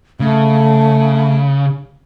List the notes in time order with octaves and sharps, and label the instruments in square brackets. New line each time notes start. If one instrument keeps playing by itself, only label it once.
[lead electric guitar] C#3 [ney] A3